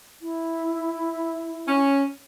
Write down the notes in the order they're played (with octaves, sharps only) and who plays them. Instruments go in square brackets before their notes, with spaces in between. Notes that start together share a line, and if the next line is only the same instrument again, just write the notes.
[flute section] E4
[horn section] C#4